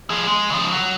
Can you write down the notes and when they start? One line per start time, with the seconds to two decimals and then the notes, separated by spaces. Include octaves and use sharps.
0.10 F3 G#4
0.27 G#3
0.50 C#3 F3
0.73 F#3